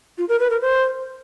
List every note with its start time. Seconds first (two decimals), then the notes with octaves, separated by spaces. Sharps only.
0.18 F4
0.29 A#4
0.40 B4
0.50 A#4
0.61 C5